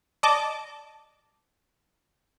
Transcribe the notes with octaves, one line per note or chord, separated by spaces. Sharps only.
D5 D#5 A5 D6